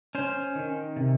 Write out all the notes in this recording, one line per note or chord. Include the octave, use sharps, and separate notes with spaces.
C#4 C5
D#3
C3